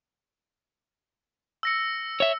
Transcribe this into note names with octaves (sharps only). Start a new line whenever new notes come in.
E6 A#6 C#7
C#5 E5